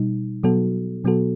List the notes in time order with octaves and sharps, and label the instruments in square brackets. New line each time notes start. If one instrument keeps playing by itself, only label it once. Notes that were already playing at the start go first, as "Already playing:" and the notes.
Already playing: [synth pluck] B2 G3 D#4
B2 F#3 B3 F#4 A4
B2 F#3 B3 F#4 A4